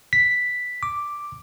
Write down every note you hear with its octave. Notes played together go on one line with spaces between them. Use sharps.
B6
D6